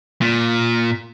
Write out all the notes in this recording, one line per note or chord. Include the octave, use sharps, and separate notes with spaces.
A#2